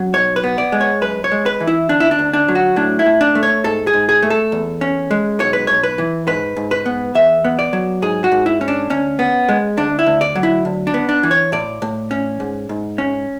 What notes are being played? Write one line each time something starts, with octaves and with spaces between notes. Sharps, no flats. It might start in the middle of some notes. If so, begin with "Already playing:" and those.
Already playing: F#3 C#4
B1 C#5
B4
B3
D5
G#3
C#5
F#2 B4
C#5
G#3
B4
E3
E4
D2 D4
E4
D4
D2
D4
F#3
F#4
A2 D4
E4
A2
D4
A3
C#5
G#2 A4
G#4
G#2
G#4
A3
A4
E2
C#4
G#3
B1 C#5
B4
B1 C#5
B4
E3
G#2 B4
G#2
B4
B3
E2 E5
B3
D5
F#3
G#2 G#4
F#4
G#2
E4
C#4
D4
D2 C#4
B3
G#3
D2 D4
E4
D2
D5
F#3
E4
D2
D4
B3
D4
E3
C#5
A2 D5
A2
C#4
G#2
G#2
C#4